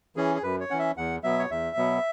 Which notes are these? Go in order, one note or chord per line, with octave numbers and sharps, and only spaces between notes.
E3 C#4 G#4
G#4
F#2 B4
C#5
E3 C#4 F#5
E5
E2 F#5
B2 F#3 B3 E5
C#5
E2 E5
B2 F#3 B3